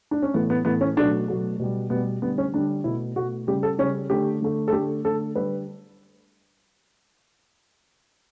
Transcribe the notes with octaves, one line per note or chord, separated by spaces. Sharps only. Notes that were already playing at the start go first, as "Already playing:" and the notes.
D4
C#4
A2 E3 A3 B3
B3
A2 E3 A3 B3
C#4
B2 F#3 A3 D4
B2 F#3 A3
B2 G3
B2 G3 B3
D3 G3 B3
C#4
D3 G3 D4
B2 A3 E4
B2 A3 F#4
C#3 G3 G4
A4
C#3 G3 C#4
D3 A3 G4
D3 A3
A4
D3 A3 G4
D3 A3 A4
D3 G3 B4